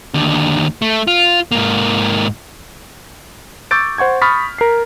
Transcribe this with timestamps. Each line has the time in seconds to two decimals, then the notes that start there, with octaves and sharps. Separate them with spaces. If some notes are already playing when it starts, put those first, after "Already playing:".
0.14 D#2 D3
0.82 A3
1.07 F4
1.52 G#2 A#3
3.71 C#6 D6 E6 G6 A6 D7
3.98 C5 F#5 C#6 G#6
4.22 B5 C#6 D#6 F6 A6 B6
4.58 A#4 C7